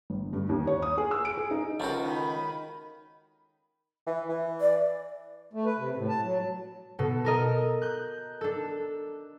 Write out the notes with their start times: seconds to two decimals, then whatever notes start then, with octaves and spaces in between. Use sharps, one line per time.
0.10 G1
0.33 G2
0.49 D#2
0.67 C#5
0.82 D#6
0.98 G#4
1.11 E6
1.25 D7
1.37 G#4
1.51 D#4
1.80 C#2 F3 F#4 A4 A#4
2.03 D#3 B5
4.07 E3
4.29 E3
4.61 D5
5.53 A3
5.65 B4
5.78 C3
5.96 A2
6.09 A5
6.23 F#3
6.99 B2 A4
7.25 A4 A#4 D#5
7.82 F#6 G6
8.41 D4 A4